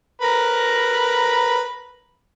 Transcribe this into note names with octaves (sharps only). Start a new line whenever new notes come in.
A#4 B4 A#5